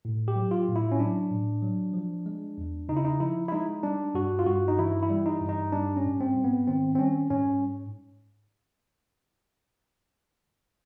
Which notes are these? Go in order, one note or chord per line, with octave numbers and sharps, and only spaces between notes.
A2
G4
F#3
F4
A2
E4
C#4
F#3 D4
A2
F#3
F3
G#3
E2
C#3 D#4
E4
D#4
F3 E4
E4
G#3 D#4
G3 D4
G2 F#4
F4
G2 F#4
D#4
E3 E4
E4
G3
D#4
G2
D#4
G3 D4
C#4
G#2
C4
G#2
B3
D#3 C4
C4
G3 C#4
G#2 C#4